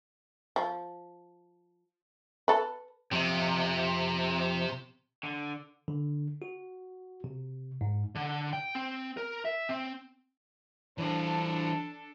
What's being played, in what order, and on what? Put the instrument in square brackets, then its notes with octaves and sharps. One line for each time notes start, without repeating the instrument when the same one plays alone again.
[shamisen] F3
A4 B4
[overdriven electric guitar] F2 [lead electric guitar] C3
[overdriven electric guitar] D3
[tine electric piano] D3
F#4
C3
G#2
[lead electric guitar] D3
G5
C4
A#4
E5
C4
[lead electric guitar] E3 C5 [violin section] D4 A4 A5